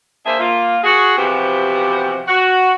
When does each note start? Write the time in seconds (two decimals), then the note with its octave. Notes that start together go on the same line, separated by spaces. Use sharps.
0.26 A#3 D4 G#4 C5 E5
0.39 A#3 F4
0.84 F#4 G#4
1.18 C3 E3 F3 B3 F#4 G4
2.28 F#4